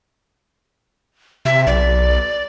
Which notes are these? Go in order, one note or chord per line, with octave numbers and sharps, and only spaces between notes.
C3 E5
B1 D5